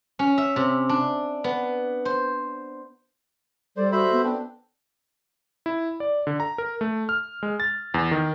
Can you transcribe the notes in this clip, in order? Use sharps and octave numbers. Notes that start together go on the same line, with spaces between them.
C#4
E5
C3
D4
B3
C5
G3 A4 C5 D5
F#4 C5 E5 B5
B3
C4 D4
E4
D5
D3
A#5
A#4
A3
F6
G#3
A6
E2
D#3